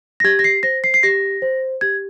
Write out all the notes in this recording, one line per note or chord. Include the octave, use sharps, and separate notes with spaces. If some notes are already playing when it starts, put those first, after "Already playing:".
A#6
G4 G#6
A#6
C7
C5 A#6
C7
C7
G4 A#6
C5
G4 G#6